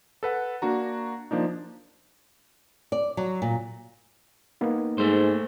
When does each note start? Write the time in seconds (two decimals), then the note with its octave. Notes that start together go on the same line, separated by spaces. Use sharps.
0.23 A4 B4 F#5
0.62 A#3 D4 F#4 A#5
1.31 F3 A#3 D4 D#4
2.92 D5
3.17 F#3
3.42 A#2
4.61 A#3 B3 D#4
4.98 G#2 A3 C5